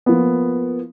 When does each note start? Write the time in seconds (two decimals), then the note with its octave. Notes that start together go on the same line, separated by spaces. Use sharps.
0.06 F3 A#3 B3